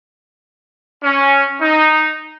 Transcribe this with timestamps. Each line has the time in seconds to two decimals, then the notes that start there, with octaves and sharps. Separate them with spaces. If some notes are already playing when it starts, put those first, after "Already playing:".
1.03 C#4
1.61 D#4